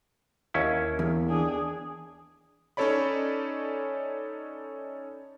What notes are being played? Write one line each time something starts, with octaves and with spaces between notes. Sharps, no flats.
D#2 C#4 E4
E2
D4 G#4
C#4 D#4 A4 C#5 D5 B5